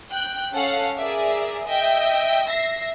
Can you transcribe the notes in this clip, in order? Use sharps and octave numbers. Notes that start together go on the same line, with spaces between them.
G5 F#6
C#4 A4 F5 F#5
G#4 A#4 D5 E5
D#5 E5 G5
E5 A#6 C7